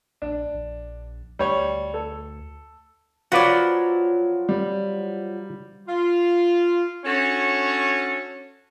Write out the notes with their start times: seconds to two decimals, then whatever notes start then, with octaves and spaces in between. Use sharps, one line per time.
0.22 A#1 D4
0.54 A#1
1.39 D2 G3 C#5
1.94 A4
3.32 F3 F#3 F#4 B4 D5
4.49 G3
5.89 F4
7.05 C#4 D4 F#4 A4 C#5